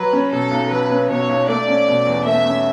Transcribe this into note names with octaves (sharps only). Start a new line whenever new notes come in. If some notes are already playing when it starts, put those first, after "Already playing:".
Already playing: F#3 B4
C#4
B2 A4
B1
F#3 B4
C#4
B2 C#5
B1
A3 D5
C#4
B2
E2
A3 E5
C#4